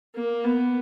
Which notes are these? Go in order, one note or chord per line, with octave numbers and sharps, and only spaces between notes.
A#3
B3